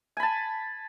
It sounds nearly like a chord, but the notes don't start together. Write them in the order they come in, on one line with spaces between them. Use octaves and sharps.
G#5 B5 A5